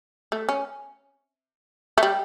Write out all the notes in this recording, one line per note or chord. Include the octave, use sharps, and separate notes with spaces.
A3
C#4
A3
G3